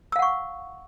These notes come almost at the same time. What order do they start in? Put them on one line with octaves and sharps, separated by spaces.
E6 F5 F#5 C#6